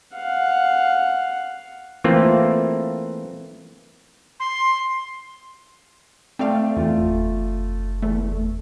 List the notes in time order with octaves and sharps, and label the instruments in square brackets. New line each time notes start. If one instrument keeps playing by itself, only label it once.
[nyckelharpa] F5 F#5
[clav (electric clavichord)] E3 A3 A#3 C4 F4
[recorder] C6
[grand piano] A3 D5 G5 [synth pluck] C4 F5
[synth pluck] E2 [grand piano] A3 F4
[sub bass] F#1
[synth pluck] E2 A3